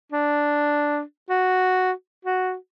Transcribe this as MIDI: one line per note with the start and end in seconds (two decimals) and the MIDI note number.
0.12 1.01 62
1.29 1.92 66
2.25 2.55 66